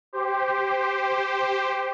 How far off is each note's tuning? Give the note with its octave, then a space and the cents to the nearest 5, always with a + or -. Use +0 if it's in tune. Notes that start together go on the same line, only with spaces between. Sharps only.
G4 +0 C5 +0